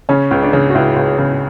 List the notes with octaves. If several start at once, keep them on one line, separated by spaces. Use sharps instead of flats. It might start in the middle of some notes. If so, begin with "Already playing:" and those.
C#3 C#4
C#2
D4
C#3
F#4
C#2 E4
C#2
C#3